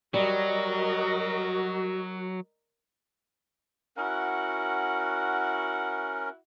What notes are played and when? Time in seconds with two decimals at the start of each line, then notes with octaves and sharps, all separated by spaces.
0.14 F#3 G3 F#4 A#4 D#5
3.97 C#4 E4 F#4 A#4 F#5